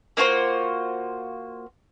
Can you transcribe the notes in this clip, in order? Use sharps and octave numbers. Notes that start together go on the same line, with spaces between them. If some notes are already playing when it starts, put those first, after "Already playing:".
A#3 F4 F#4 C5